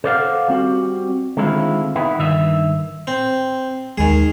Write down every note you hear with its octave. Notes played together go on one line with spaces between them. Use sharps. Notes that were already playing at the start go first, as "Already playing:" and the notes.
A4 C5 D5 D#5 F5 F#5
G3 C4 F#4
D3 D#3 G#3 C4 E4 F4
B3 D#4 E4
G2 D#3 E5
C4
D#2 D#3 G#3 G#4